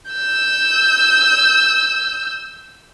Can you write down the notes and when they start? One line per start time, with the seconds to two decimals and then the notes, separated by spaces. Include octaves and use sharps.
0.11 E6 G6